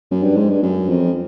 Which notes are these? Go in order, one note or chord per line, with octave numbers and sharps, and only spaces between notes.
F#2
G2
G#2
G2
F#2
F2